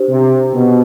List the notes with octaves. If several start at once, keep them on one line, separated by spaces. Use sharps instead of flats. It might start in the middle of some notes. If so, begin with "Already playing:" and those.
Already playing: D4 G4 C5
C3
B2